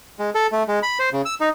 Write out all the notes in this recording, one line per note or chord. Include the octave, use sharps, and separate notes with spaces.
G#3
A4
A3
G#3
B5
C5
C#3
E6
D#4